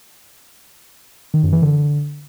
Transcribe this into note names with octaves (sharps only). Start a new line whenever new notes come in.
D#3
F#2
E3
D3